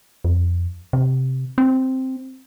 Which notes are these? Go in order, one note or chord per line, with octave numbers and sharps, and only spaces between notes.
F2
C3
C4